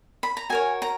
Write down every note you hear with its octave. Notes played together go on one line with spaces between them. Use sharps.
B5
A#5
F#4 A#4 C#5 G#5
A#5